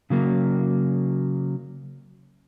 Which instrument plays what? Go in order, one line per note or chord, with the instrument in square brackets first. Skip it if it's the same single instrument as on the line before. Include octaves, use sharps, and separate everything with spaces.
[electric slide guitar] C#3 F#3 A#3